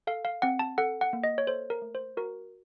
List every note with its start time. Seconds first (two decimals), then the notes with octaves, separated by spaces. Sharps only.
0.07 A4 F5
0.25 F5
0.42 C4 F#5
0.59 A5
0.78 A4 F#5
1.01 F#5
1.13 A#3
1.24 D#5
1.38 C#5
1.47 A4 C5
1.70 A#4
1.82 A3
1.95 C5
2.17 F#4 A#4